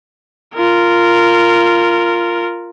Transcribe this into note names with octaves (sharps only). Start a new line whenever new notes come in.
F4 A#4